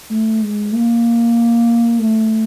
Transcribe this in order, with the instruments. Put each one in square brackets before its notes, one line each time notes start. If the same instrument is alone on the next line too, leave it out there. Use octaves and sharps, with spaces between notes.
[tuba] A3
G#3
A#3
A3